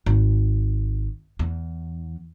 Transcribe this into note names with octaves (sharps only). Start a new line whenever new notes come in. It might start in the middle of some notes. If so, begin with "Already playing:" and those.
G#1
E2